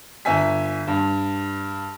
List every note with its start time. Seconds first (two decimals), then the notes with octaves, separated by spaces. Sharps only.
0.25 G1 E5 G#5 B6
0.87 G2